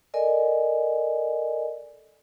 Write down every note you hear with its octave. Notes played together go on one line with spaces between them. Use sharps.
A4 A#4 D5 D#5 G#5